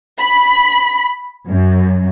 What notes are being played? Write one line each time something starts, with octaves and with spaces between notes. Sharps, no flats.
B5
F#2